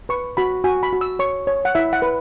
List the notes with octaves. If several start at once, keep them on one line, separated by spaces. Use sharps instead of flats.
B4 C#6
F#4 B5
F#4 G#5
B5
F#4
E6
C#5 C#6
C#5
F#5
E4 E5
F#5
B4